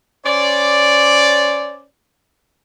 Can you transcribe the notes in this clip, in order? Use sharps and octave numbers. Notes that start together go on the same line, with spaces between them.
C#4 C5 D5